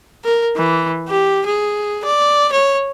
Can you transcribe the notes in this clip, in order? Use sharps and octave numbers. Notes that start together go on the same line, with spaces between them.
A#4
E3
G4
G#4
D5
C#5